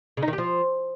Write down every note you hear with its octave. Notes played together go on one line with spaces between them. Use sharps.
C#3
D#4
D#3
G4
F3